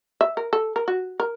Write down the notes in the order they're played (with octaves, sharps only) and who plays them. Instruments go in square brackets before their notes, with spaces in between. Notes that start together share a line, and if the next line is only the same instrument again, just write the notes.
[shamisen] E5
A#4
A4
A#4
F#4
A#4